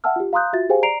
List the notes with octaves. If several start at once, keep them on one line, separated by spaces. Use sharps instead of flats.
E5 F#5 G5 A5 E6 F6
F4 G4
F5 A#5 C6 D#6 F#6 G6
F4 F#4 E5 A6
G4 G#4 C5 F5 G5 G#5
D5 A#5 C7 D7 F7